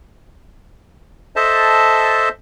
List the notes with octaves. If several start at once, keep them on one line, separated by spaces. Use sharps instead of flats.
A4 C5 D#5 E5 A5